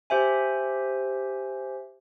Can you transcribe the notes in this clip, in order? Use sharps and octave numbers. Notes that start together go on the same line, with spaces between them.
G4 C5 E5 G#5